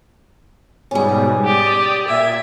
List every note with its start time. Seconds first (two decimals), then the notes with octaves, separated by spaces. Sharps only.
0.91 G#2 B2 G3 C#4 G#4
1.44 G4 D5 D#6
2.08 A#2 E5 G#6